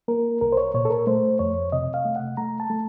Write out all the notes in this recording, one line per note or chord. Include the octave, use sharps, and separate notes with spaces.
A#3 A#4
C2 A#4
C5
C#5
A#2 C#5
A4
A#4
A3 C5
F2 C#5
C3 D#5
F5
A3
F#5
A3 A#5
A5
A3